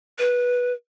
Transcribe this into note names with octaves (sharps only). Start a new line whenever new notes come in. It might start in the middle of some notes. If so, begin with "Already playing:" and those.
B4